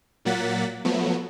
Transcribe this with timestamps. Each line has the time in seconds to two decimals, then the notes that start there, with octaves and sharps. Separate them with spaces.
0.25 A#2 F#3 A#3 F#5 A6 B6
0.85 F3 F#3 A3 B3